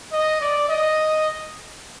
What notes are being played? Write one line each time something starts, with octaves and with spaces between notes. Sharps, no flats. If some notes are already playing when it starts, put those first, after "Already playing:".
D#5
D5
D#5